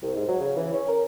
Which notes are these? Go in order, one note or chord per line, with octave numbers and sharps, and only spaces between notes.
C2
G#2
F#3
C#3
E3
C#4
A#4